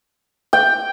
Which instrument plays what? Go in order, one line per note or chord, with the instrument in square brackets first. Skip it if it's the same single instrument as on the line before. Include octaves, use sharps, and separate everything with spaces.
[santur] G5